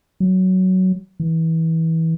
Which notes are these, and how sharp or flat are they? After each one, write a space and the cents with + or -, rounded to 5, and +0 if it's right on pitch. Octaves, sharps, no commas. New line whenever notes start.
F#3 +10
E3 -25